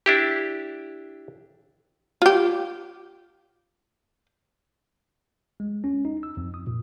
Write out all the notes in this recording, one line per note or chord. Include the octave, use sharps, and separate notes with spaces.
D4 E4 G4
F4 G4
G#3
C#4
D#4
E6
F2
D#6
A#2